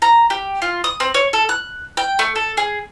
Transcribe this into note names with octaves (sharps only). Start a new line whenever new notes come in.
A#5
G4
F4
D#6
C4
C#5
A4
F#6
G5
A3
A4
G#4